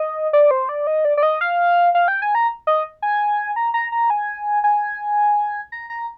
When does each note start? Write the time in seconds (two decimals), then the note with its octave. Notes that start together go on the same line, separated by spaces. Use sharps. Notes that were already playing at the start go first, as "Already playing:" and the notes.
Already playing: D#5
0.33 D5
0.51 C5
0.69 D5
0.87 D#5
1.05 D5
1.17 D5
1.23 D#5
1.41 F5
1.95 F5
2.08 G5
2.22 G#5
2.35 A#5
2.67 D#5
3.02 G#5
3.56 A#5
3.74 A#5
3.92 A#5
4.10 G#5
4.64 G#5
5.72 A#5
5.90 A#5